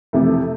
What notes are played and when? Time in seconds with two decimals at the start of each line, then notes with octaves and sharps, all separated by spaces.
0.13 F2 C3 E3 A3